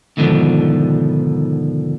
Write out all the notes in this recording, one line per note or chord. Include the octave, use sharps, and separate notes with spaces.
D2 G#2 B2 D3 D#3 F3